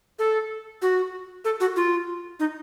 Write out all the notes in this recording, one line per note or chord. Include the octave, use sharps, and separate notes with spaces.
A4
F#4
A4
F#4
F4
D#4